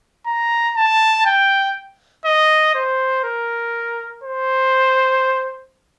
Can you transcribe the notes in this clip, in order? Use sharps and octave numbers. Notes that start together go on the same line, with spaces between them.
A#5
A5
G5
D#5
C5
A#4
C5